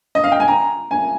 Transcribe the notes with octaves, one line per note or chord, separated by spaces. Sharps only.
D#5
F5
G5
G#5
A#5
G#5